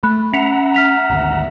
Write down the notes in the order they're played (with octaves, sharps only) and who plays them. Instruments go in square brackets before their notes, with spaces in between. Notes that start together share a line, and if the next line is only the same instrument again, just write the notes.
[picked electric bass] A3 [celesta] B5 F#6
[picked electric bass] C#4 [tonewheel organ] E5 F#5 A#5
[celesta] F6 B6 F7
[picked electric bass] G#1 D2